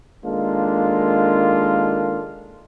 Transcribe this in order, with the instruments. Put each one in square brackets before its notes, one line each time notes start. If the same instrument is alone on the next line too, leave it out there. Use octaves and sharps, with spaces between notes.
[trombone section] D#3 G#3 A#3 D4 F4 A4